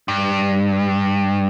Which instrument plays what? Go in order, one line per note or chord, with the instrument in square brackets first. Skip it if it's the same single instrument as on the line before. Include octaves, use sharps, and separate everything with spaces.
[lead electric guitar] G2